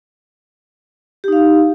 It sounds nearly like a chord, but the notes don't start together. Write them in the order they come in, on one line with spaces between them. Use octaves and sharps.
G4 D#4 F5